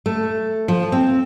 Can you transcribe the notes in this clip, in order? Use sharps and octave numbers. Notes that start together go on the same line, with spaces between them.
A3
F3
C4